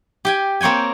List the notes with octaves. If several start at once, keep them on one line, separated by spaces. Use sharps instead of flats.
G4 G5 G#5
A#3 C4 C#5 G5 G#5